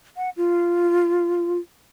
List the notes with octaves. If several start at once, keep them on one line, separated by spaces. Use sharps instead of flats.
F#5
F4